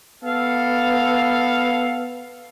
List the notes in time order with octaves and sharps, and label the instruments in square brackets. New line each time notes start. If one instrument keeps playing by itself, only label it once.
[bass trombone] B3 [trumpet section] A4 F5